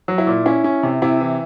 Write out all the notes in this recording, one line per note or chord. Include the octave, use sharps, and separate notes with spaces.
F#3
E4
A#2
C#4 E4
C#4
C3
C3 E4
E3